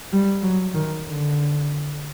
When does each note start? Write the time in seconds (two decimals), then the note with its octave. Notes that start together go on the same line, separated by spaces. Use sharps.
0.13 G3
0.43 F#3
0.74 D#3
1.06 D3